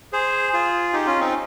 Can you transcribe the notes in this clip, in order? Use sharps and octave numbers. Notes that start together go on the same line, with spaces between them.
G#4 C5
F4 G#4
D#4 G4
C#4 F4
C4 D#4